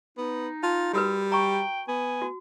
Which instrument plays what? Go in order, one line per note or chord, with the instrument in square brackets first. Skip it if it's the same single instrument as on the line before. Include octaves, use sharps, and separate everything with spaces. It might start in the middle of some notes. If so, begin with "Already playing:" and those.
[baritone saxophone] B3 [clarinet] D#4
[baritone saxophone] F4 [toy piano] A5
[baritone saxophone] G3 [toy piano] F#4 A#4 B4
[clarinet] G5 [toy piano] A#5 C#6
[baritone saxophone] B3 [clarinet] G#5
[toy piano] F#4